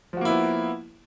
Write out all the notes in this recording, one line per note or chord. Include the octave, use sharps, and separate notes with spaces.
F3 A#3 B3 E4 F#4